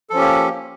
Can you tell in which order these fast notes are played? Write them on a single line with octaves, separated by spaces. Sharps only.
A4 F3 C#4 G4 A#3